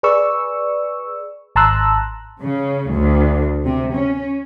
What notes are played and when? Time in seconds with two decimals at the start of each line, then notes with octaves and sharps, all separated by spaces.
0.03 G#4 B4 D5 C#6 E6
1.56 G#1 A5 A#5 C6 E6 F#6
2.41 C#3
2.90 D2
3.65 C3
3.94 C#4